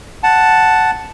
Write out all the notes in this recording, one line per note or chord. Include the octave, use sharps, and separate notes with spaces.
F#5 A5